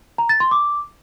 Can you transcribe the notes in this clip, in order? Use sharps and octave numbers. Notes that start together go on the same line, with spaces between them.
A#5
A6
C6
D6